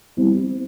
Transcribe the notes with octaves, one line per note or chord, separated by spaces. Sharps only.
G3 C4 E4